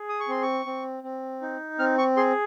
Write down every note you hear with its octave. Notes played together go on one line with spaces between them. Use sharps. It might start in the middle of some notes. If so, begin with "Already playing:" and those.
Already playing: G#4
D#6
C#6
C4 C6
C#6
C4
C4
D#4
C4 F6
C#6
G#4 C6